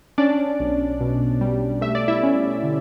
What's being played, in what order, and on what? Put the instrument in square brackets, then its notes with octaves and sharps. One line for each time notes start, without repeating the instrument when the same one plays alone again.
[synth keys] C#4 D4 D5
B1
B2
G3
A3 E5
D5
E4 E5
C#4
D3